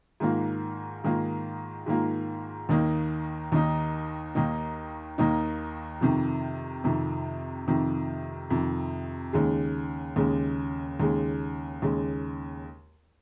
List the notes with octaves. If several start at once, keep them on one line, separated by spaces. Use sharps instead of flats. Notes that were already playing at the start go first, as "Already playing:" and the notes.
G#2 D#3 A#3 F4
G#2 D#3 A#3 F4
G#2 D#3 A#3 F4
D#2 D#3 A#3 D#4
D#2 D#3 A#3 D#4
D#2 D#3 A#3 D#4
D#2 D#3 A#3 D#4
F2 C3 D#3
F2 C3 D#3
F2 C3 D#3
F2 C3 D#3
D#2 C#3 G#3
D#2 C#3 G#3
D#2 C#3 G#3
D#2 C#3 G#3